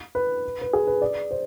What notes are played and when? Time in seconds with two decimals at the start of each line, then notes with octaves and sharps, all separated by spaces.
0.15 B4
0.61 B4
0.73 G#4
0.87 B4
1.02 D5
1.31 C5